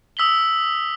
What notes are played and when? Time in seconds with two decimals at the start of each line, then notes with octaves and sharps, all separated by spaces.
0.17 D#6 E6 B6 F#7 G7